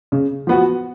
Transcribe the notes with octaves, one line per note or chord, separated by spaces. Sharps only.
C#3
F3 B3 F#4